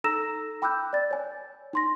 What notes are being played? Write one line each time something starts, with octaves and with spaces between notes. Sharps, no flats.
D#4 A4 A#5 E6 A#6 E7
G5 B5 D6 E6 F#6 G6
D5 A6
C#5 G#5
D#4 C6 A#6